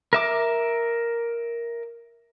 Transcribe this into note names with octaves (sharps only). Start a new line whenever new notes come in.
A#4 E5 D6